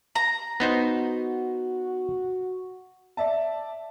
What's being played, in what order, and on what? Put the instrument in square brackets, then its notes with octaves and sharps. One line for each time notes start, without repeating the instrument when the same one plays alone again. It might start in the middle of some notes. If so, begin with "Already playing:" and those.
[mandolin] A#5
[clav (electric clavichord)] B3 D#4 C5 [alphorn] F#4
[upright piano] D5 E5 A5